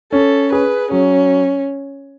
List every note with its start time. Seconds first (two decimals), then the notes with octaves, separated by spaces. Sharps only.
0.12 C#4 A4
0.52 G#4 B4
0.91 F#3 C#4